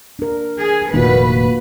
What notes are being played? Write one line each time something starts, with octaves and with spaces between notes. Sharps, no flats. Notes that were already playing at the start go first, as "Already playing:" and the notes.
D4 A#4
G#4
F1 A#2 D#3 A#3 F#4 B4